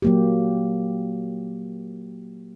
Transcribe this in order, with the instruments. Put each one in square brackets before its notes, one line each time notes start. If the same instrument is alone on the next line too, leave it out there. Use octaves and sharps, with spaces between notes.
[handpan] F#3 A#3 G4